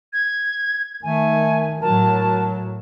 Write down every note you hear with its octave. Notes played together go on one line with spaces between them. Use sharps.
G#6
D#3 A3 G#5
A2 F#3 A#4 A5